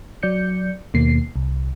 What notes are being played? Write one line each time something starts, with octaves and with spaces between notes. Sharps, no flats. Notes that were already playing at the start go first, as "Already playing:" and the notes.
F#3 D5 G6 C#7
D#2 B2 A#3 C7
C2